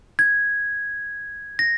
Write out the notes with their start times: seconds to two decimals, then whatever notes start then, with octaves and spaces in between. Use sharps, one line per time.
0.19 G#6
1.59 A#6